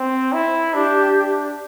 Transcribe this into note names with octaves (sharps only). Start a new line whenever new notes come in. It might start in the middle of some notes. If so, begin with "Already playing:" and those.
Already playing: C4
E4
D4 G4